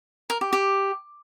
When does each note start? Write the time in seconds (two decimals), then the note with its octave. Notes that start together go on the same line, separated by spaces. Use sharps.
0.30 A#4
0.41 G4
0.53 G4